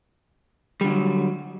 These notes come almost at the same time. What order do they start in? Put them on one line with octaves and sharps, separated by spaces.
G3 D3 F#3